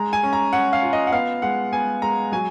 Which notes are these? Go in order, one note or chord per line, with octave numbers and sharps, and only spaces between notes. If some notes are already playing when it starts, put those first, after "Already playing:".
Already playing: G#3 A#5
G#5
C#4
A#5
C#4 F#5
F5
F4
D#5
F#5
B3 F5
G#3 F#5
B3 G#5
G#3 A#5
F#3 G#5